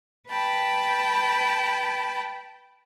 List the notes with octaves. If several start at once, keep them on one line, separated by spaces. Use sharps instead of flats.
B4 G5 A5 B5